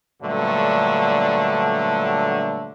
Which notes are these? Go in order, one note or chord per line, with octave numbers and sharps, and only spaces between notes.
G2 A#2 D3 F#3 A3